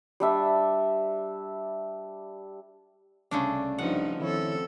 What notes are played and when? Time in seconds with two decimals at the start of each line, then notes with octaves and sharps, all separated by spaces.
0.20 G3 D4 E5
3.31 C2 C#3 A3 D4 D5
3.78 G2 F3 D#4 F#5
4.20 F2 D#3 E4 A4 C#5